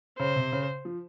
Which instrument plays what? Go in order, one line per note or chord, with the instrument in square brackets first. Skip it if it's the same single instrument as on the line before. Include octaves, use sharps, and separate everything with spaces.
[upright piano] C#3 [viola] C5
[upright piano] C3
C#3
F3